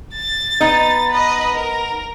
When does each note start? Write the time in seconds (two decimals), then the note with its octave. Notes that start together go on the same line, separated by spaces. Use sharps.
0.14 A6
0.61 B3 D#4
1.10 B4 D#5
1.54 A#4